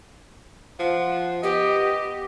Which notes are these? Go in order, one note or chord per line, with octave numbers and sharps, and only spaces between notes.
F3 F#5
B3 G4 D#5